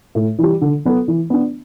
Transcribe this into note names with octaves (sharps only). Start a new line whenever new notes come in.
A2
E3 G3
D3
F#3 B3 F#4 A4
E3
B3 D4